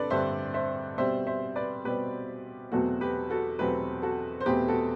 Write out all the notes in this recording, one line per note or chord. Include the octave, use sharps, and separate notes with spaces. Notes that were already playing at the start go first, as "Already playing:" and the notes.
Already playing: G2 D3 C4 D4 A4 B4 D5
G2 D3 G3 C4 C5 E5
C5 E5
B2 G3 C4 C5 E5
C5 E5
B4 D5
B2 G3 C4 G4 B4
E2 B2 F#3 A3 C4 F#4 A4
G4 B4
F#4 A4
E2 B2 F#3 A3 C4 G4 B4
F#4 A4
C5
E2 B2 A3 C4 G4 B4
F#4 A4